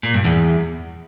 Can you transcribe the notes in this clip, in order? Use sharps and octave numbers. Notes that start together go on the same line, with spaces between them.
A#2
G2
E2